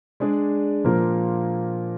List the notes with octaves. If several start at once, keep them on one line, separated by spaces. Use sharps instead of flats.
G#3 D4 G#4 D5
A#2 F3 A#3 F4 A#4